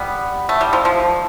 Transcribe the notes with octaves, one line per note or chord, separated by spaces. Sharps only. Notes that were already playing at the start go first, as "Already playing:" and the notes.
Already playing: G3 B3
A3
G3
F3
F3